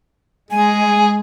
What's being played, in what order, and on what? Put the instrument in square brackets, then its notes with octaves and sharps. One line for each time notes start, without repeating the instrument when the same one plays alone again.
[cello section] G#3 [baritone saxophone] G#4 [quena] G#5